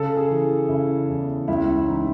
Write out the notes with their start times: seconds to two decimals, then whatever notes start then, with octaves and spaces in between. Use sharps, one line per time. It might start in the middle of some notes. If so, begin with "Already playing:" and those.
Already playing: C#3 A4
0.17 G#4
0.30 E3
0.69 C#3 E4
1.09 E2
1.48 C#2 E4
1.88 E3 D#4